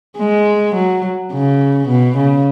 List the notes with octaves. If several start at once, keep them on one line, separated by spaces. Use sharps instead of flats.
G#3
F#3
C#3
B2
C#3